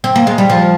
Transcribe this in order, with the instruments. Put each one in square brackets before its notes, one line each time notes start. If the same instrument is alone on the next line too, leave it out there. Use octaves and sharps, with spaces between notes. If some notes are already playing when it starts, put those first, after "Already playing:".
[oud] C4
A#3
G#3
G3
F3